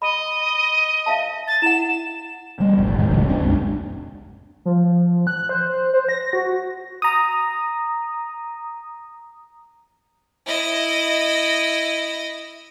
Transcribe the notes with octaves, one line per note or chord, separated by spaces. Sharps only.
D#5 B5
E5 F5 A5
A6
E4 F#5 E7
G3 A3
E1 A#1 A2
F1 A2 D#3 G#3
F1 C#2 C#3 F#3
D#2 B3 D4
A#1 F2 G#3
F3
F#6
C5
C5
A#6
F#4
A#5 D#6
E4 D#5